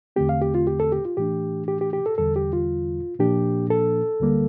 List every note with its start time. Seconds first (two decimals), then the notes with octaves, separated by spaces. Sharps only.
0.16 E2 D3 A3 C4 G4
0.29 F5
0.42 G4
0.55 F4
0.67 G4
0.80 A4
0.92 G4
1.05 F4
1.17 A2 E3 A3 D4 G4
1.68 G4
1.81 G4
1.93 G4
2.06 A4
2.18 E2 D3 G3 A4
2.36 G4
2.53 F4
3.19 A#2 F3 A#3 D4 G4
3.70 A4
4.20 D2 D3 G3 A#3